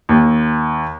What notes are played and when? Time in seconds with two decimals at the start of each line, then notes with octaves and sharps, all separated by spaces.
0.09 D#2